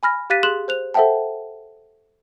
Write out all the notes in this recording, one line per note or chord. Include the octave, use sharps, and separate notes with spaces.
G#5 B5 F6 A#6
G4 F5 F#6 A6 B6 D#7
G#4 C6 F#6 E7 F#7
C5 F#6 F7
A4 C5 E5 F#5 G5 A5